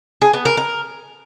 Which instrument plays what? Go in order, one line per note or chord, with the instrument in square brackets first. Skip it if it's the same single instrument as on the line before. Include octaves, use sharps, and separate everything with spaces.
[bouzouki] G#4
B3
A#4
A#4